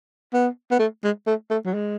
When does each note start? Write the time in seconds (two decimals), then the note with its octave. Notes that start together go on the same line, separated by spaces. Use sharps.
0.33 B3
0.71 B3
0.79 A3
1.04 G#3
1.27 A3
1.50 A3
1.65 F#3
1.74 G#3